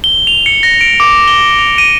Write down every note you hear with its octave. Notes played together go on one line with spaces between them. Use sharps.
G7
F7
C#7
A#6
D7
D6
G7
F7
D#7